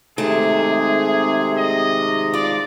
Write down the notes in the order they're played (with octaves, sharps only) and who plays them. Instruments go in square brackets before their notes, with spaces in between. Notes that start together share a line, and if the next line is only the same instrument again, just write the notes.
[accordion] C3 [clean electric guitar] D#3 G#3 [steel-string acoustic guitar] A3 [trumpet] G#4
[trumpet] D#5
[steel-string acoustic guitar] F4 [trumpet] D5